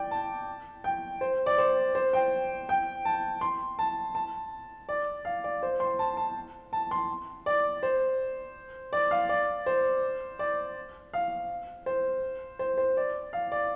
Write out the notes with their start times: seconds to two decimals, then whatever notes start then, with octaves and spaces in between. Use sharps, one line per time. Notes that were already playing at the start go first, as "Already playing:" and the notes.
Already playing: D5 G5
0.11 A5
0.84 G5
1.21 C5
1.46 D5
1.58 C5
1.95 C5
2.13 G5
2.69 G5
3.05 A5
3.41 C6
3.79 A5
4.15 A5
4.89 D5
5.25 F5
5.44 D5
5.63 C5
5.80 C6
5.99 A5
6.17 A5
6.73 A5
6.91 C6
7.46 D5
7.83 C5
8.93 D5
9.11 F5
9.29 D5
9.66 C5
10.39 D5
11.14 F5
11.86 C5
12.59 C5
12.78 C5
12.97 D5
13.33 F5
13.52 D5